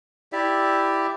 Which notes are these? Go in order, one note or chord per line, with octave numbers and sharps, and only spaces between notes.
E4 G4 D5 E5